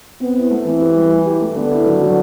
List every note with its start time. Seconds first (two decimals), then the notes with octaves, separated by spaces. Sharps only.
0.21 B3 C4
0.36 E4
0.51 A3
0.66 E3 C4
0.81 G4
0.96 G3
1.11 E4
1.26 G4
1.41 A3
1.56 D3 B3
1.71 E4
1.86 F#3
2.01 F#3